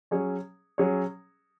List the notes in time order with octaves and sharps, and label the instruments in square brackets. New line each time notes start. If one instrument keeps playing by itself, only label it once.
[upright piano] F#3 C#4 G#4 C#5
F#3 C#4 G#4 C#5